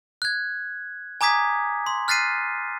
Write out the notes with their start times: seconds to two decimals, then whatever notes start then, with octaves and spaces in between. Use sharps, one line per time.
0.22 F#6 G#6
1.21 G#5 A#5 D6 D#6 G#6 B6
1.86 C6
2.08 F6 F#6 A6 B6 C7 D#7